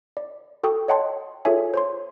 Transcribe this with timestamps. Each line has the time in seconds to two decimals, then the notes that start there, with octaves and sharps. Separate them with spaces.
0.17 D5
0.63 F#4 A4 G5 C#6 D#6
0.88 C#5 D#5 F#5 G5 A5 C6
1.45 F4 G#4 A4 C#5 E5 G#5
1.74 C5 C#5 C6